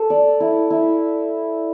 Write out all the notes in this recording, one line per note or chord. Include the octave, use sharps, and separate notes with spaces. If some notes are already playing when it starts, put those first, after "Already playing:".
Already playing: A4
D5
E4
E4